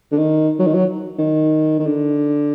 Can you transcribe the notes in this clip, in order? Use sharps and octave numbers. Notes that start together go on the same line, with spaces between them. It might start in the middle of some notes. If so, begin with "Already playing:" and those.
D3
D#3
F#3
D#3
F#3
D#3
D#3
D3